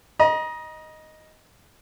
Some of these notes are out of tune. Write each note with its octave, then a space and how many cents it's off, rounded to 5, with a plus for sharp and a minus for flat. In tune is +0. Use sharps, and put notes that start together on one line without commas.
D#5 +0 A#5 +40